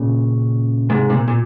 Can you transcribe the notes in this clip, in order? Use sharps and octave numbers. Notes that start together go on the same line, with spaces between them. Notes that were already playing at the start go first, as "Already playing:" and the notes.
Already playing: A#2 C#3
G#2 C3
C3
A#2
A#2